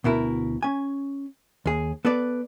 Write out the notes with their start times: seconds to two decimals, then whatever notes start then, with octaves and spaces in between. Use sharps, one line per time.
0.04 D2 B2 E4 A#4
0.63 C#4 G#5
1.66 D#2 G#4
2.05 B3 A4 B4 D5